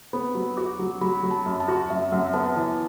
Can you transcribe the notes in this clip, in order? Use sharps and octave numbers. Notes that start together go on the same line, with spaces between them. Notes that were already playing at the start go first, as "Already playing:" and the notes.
B3 B5
F#3
F#4 D6
F#3
F#3 B5
F#3
A5
F#2
A5
F#4
F#2 E5
F#2 F#5
B3 A5
E3 A5